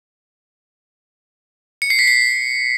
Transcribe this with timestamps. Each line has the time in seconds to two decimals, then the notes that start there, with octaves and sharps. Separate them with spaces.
1.82 C#7
1.90 C7
1.99 B6
2.07 C7